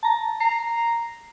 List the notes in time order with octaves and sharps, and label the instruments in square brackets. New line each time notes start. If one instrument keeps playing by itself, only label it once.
[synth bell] A5 A#5
[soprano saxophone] A#5 [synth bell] C7